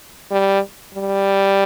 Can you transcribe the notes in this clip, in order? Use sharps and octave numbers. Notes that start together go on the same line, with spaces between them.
G3
G3